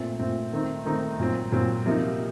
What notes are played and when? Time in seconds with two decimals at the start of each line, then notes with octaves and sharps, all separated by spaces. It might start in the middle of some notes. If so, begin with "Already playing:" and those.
Already playing: A#2 A3 C4
0.19 A#2 A3 C4
0.53 D#3 A3 C4 D#4
0.85 D#3 A3 C4 D#4
1.19 A#2 F#3 C4
1.52 A#2 F#3 C4
1.86 C3 F3 A#3 D#4